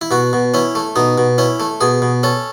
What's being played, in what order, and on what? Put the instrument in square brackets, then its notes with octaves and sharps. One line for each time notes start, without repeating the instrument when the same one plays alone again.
[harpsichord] E4
B2 F#4
B2
C#4 E4
A3
B2 D#4
B2
C#4 E4
A3
B2 G#4
B2
C#4 A4